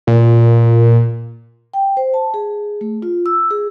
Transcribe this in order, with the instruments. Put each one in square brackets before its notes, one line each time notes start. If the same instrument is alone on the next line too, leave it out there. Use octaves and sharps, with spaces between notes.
[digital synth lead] A#2
[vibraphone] G5
C5
A5
G#4
A3
F4
E6
G#4